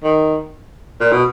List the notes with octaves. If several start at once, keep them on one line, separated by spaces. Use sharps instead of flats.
D#3
A#2
B2